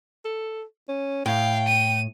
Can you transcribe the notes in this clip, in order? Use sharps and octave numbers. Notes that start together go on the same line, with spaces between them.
A4
C#4
A2 F5 G5
D#7